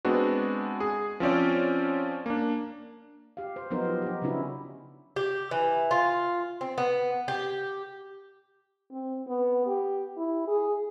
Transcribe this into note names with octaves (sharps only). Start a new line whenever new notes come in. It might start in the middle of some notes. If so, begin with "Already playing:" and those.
G#3 B3 C4 D4 F#4
G#4
F3 C4 C#4 D5
A#3 D4
G4 F5
C5
F3 F#3 B3 D#4 A#4 C5
G4
D#4 G4
C#3 F#3 C#4 D4 E4 F#4
G4
E3
F4
C4
B3
G4
C4
B3
G4
E4
G#4